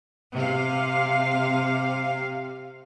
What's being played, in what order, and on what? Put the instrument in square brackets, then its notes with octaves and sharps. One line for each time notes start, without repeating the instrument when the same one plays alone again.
[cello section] C3 F5